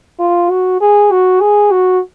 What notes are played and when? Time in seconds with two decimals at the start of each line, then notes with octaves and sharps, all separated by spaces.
0.19 F4
0.50 F#4
0.81 G#4
1.12 F#4
1.41 G#4
1.72 F#4